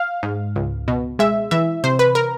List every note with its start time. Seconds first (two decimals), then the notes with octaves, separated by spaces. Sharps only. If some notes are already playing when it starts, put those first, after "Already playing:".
Already playing: F5
0.23 G#2
0.56 C#2
0.88 B2
1.19 G#3 E5
1.51 E3 E5
1.84 C3 C5
1.99 B4
2.15 A#4